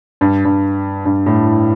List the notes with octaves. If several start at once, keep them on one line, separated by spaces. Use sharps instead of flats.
G2
G2
G2
A2